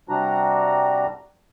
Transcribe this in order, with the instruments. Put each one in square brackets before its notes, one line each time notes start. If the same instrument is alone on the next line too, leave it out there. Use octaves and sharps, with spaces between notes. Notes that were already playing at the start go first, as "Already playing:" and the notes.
[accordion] C3 G3 D4 F#4 A#5